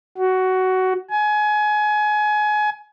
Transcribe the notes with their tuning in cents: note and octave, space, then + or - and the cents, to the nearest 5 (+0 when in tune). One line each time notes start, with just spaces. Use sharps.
F#4 +15
G#5 +25